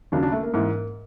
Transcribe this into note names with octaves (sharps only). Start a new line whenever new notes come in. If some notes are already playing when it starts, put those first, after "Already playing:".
D#2 C#3 F#3 D4
D4
A3
A#3
G#2 E3 A#3